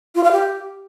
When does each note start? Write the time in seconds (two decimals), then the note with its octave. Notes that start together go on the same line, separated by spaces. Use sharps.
0.15 F4
0.24 F5
0.32 G4